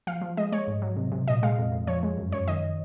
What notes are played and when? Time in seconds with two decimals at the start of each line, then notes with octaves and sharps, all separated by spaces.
0.07 F3 F5
0.21 F3
0.37 G#3 D#5
0.52 G#3 C#5
0.68 G#2
0.82 F#3
0.97 C3
1.12 C3
1.28 A#2 D#5
1.43 G#3 F5
1.58 F2
1.72 F2
1.87 F3 C#5
2.03 G#3
2.18 F#2
2.32 F#2 C#5
2.48 D#3 D#5